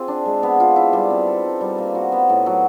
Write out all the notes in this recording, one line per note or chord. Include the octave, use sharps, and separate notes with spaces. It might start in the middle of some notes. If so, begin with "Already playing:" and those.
Already playing: C4 F4 G#4
D4
G#3
B3
F4
E4
G3
C4
A4
D#4
G3
A#3
F#4
B3
A2
F#3